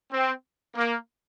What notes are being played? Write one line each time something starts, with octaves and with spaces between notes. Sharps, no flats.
C4
A#3